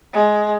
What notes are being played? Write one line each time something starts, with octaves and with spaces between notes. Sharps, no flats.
G#3